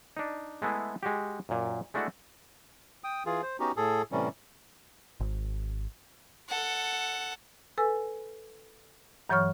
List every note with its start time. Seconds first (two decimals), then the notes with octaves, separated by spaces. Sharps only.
0.17 D4 D#4
0.62 G#3 A3 B3 E4 G#4
1.03 G#3 F#4 G4
1.49 F#2 A#2
1.94 G#3 A3 D4 E4 F#4
3.04 G5 D#6
3.26 E3 F4 G#4
3.43 C5
3.60 B3 C#4 D#4 F#4 G4
3.77 A2 G#4 A4
4.12 A2 C3 E3 G3 C#4
5.20 G#1
6.49 A4 F#5
7.78 A4 B4 G#5 E6
9.30 G2 E3 F#3 C#5 C#6 F6